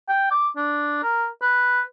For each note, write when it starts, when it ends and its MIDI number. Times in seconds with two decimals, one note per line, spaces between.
0.09 0.31 79
0.31 0.48 86
0.57 1.02 62
1.03 1.26 70
1.42 1.81 71